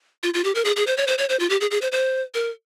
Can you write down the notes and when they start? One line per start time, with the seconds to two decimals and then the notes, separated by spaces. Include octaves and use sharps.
0.23 F4
0.34 F4
0.44 G4
0.55 A#4
0.65 G#4
0.76 G#4
0.87 C5
0.97 C#5
1.07 C5
1.18 C#5
1.29 C5
1.40 F4
1.50 G4
1.61 G#4
1.71 G#4
1.82 C5
1.92 C5
2.34 A#4